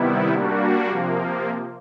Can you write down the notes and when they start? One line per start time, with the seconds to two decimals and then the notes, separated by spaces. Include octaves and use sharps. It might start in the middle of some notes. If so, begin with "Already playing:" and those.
Already playing: C3 D#3 G3 B3 E4
0.31 G3 A#3 D4 F#4
0.90 C3 F3 A#3